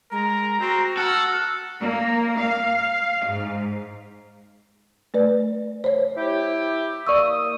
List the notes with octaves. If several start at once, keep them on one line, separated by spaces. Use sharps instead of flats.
G#3 A#4 A#5
C4 F#4
A4 F#5 F6
A#3
F5
G#2
A3 B4 D5
C5 C#5
E4 G4
A#3 D5 C#6 D#6 E6